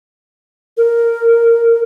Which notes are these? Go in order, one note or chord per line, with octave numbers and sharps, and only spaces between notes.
A#4